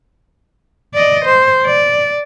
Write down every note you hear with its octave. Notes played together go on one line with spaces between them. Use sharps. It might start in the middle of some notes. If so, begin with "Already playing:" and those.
D5 D#5
C5
D5